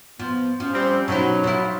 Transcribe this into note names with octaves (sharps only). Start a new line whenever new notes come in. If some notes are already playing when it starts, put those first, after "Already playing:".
F3 B3
F3 C#4
G3 C4
B2 F#3 D#4 E4
F3 E4